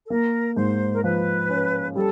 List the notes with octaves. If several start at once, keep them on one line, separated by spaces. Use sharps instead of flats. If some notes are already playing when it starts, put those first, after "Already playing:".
A4
A#3 A#4
G#2 C5
A#4
F3 B4
C#4
G3 A4